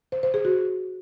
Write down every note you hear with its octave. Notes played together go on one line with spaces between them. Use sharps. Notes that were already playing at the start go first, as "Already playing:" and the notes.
C5
C5
G#4
F#4